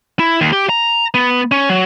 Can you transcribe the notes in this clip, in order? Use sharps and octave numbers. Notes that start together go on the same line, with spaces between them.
E4
D#2
G4
A#5
B3
C#4
F#3